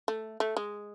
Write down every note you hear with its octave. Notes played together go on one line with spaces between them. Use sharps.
A3
A3
G#3